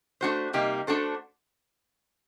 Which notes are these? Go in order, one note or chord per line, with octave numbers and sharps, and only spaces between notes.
A3 D4 F#4 C5
C3 G3 A#3 D#4 G4
A3 D4 F#4 A4 C5